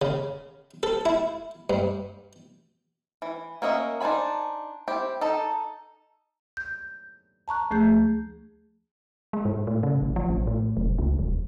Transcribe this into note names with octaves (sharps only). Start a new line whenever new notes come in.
C#3
A4
E4
G2
E3
A#3 C#4 A#4 D#5 E5
D4 D#4 C5 G#5 B5
C4 E4 G4
D#4 A4
G6
A5 A#5 C#6 F#6
D2 F3 A3 G#4 G6
G#3
G#2
A2
C#3
G#1
F3
A1
A2
F1
C#2
D#1